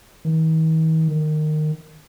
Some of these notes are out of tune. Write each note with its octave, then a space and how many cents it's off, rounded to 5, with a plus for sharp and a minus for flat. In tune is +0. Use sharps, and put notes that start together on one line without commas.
D#3 +45
D#3 -20